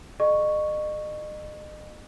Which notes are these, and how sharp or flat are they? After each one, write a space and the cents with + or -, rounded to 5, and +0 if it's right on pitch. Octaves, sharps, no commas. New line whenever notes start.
G#4 +45 D#5 -40 C#6 +0